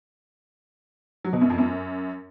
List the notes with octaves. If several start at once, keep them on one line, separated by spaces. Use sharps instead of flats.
F#3
B2
F#2
F2
F#2